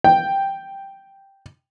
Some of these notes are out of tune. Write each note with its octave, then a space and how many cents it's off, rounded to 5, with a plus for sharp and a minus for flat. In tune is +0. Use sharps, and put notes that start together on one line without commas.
G5 +0